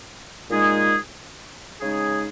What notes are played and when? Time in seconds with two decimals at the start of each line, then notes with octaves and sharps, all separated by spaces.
0.50 A#2 G#3 D#4 G#4
1.81 C#3 G#3 D#4 G#4